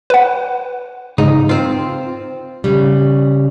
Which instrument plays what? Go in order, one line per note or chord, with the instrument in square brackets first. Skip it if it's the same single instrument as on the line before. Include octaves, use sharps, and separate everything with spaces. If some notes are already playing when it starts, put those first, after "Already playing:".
[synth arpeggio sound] B4 F#5
[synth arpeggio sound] G#2 C#3 [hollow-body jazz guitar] D#4
[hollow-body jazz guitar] C4 F4
[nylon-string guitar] C#3 G3